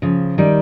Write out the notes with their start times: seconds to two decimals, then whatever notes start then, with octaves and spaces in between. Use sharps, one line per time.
0.02 C#3 F3
0.38 D#3 G3